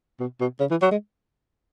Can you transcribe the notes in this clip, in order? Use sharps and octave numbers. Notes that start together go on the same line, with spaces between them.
B2
B2
C#3
E3
F#3
G#3